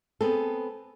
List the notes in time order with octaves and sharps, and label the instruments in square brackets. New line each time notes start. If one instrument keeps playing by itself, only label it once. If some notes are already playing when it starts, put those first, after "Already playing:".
[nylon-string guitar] B3 C4 G#4 A4